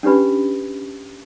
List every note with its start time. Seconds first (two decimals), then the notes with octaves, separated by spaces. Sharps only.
0.03 C#4 D4 G4 B4 B5